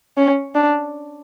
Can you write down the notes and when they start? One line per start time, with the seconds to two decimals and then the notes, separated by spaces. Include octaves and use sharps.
0.17 C#4
0.55 D4